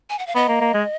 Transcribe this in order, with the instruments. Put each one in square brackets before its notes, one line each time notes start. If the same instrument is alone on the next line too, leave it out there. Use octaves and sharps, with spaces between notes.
[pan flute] G#5
F#5
F5
[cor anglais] B3 [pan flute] D#5
[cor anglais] A#3
A#3
G#3